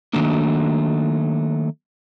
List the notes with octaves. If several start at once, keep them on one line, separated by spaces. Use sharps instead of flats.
D#3 F#3 A3 A#3 D4